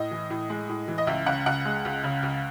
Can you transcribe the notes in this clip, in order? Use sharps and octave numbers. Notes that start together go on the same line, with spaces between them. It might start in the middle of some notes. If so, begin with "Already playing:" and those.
Already playing: A2 D#5
E3
A2
G#3
A2
E3
D#5
C#2 E5
C#3 F#5
C#2 F#5
G#3
C#2
C#3
C#2